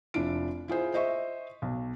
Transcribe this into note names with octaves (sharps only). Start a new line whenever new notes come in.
F1 D4 E4 F4 D7
E4 F4 G#4 C5
C5 D#5 E5 C#6
B1